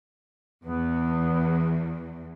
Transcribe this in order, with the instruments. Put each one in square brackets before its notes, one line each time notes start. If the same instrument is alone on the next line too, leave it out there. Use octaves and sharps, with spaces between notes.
[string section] E2 [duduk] B3